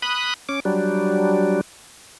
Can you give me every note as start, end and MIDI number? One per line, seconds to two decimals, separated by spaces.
0.02 0.34 83
0.02 0.34 87
0.02 0.34 90
0.49 0.60 61
0.49 0.60 86
0.65 1.61 54
0.65 1.61 55
0.65 1.61 62